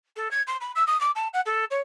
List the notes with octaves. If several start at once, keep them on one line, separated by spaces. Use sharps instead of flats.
A4
G#6
C6
B5
E6
D#6
D6
A5
F#5
A4
C#5